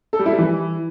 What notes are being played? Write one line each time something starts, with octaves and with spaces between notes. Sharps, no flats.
A4
G3
E4
G3
E3